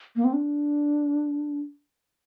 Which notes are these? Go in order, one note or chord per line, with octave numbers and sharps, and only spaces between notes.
A#3
C4
D4